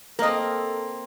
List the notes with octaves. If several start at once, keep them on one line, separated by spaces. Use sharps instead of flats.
A#3 C4 A4 A#4 D#5